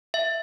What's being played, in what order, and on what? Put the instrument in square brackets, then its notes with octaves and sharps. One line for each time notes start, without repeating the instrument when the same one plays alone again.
[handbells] E5